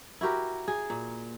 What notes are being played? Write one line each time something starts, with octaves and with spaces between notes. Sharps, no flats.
E4 F#4 G4 A#4
G#4
A#2